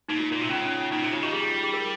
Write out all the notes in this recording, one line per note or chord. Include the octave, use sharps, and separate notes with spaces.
A#2 D#4
F4
F4
A#2
C3 F4
C#3 C#4
C#4
A#2 D#4
C3 F4
C#3 F4
D#3 G4
G3 G#4
G#4
A#4